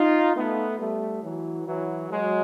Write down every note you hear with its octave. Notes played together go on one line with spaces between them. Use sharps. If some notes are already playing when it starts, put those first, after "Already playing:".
Already playing: D#4 F4
A3 B3
G3 A3
E3 F#3
E3 F#3
F#3 G#3